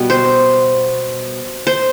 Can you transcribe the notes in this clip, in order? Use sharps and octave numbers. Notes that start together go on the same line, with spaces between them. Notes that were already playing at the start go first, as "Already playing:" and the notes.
Already playing: B2 G3
C5
C5